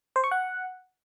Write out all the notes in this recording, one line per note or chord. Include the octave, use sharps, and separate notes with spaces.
C5
C#6
F#5